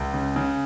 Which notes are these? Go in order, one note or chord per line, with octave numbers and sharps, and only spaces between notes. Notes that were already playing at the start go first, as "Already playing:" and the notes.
Already playing: C#2
C#3
C#3